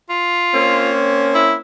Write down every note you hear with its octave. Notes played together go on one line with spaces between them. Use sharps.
F4
A#3 C4 C#4
E4